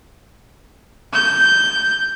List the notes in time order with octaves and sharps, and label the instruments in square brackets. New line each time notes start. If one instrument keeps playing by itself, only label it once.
[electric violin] G6